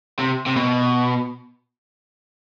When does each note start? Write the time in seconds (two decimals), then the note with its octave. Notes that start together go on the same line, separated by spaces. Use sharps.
0.19 C3
0.46 C3
0.57 B2